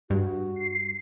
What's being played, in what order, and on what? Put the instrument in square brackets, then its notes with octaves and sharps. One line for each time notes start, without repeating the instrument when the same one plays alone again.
[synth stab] G2 [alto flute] F#4
[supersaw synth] C7